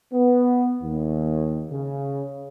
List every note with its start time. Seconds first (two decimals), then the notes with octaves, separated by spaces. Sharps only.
0.13 B3
0.82 D#2
1.71 C#3